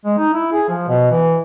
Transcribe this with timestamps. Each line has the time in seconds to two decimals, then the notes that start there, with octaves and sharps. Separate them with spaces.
0.05 G#3
0.18 D#4
0.33 E4
0.53 G#4
0.69 F3
0.88 B2
1.11 E3